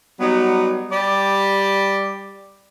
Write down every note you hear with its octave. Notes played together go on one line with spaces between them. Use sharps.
F#3 G3 B3 D#4
G3 G4 D5